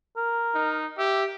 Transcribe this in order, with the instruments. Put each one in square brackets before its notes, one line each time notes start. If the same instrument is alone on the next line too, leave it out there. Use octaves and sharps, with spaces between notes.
[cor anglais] A#4
[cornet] D#4
[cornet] G4 [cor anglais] E5